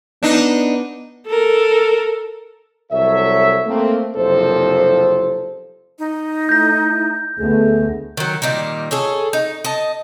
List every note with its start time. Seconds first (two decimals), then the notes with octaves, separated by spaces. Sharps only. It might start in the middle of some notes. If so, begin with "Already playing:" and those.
0.23 B3 D4 D#4
1.27 A4 A#4
2.92 C2 F#3 A4 C#5 E5
3.66 A3 A#3 C4
4.17 F#1 C2 C3 F3 A4 C5
5.99 D#4
6.49 A3 E4 G6 A#6
7.39 D2 G#3 A3 B3
8.17 D#3 F#3
8.42 A#2 D#3 G3 A#3
8.91 G#4 A4 C#5
9.33 D#4
9.64 D#5 A5